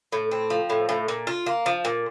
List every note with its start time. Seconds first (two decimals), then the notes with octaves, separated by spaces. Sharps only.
0.12 A2
0.31 C4
0.50 F3
0.70 A2
0.89 A2
1.08 A#2
1.27 F4
1.46 A#3
1.66 F3
1.85 A#2